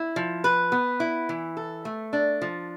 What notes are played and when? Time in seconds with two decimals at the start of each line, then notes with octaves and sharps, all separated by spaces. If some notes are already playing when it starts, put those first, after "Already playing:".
Already playing: E4
0.16 F3
0.44 B4
0.72 B3
1.00 E4
1.29 E3
1.57 A4
1.85 A3
2.13 D4
2.42 F3